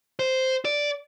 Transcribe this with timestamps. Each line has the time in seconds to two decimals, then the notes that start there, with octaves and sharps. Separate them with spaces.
0.19 C5
0.65 D5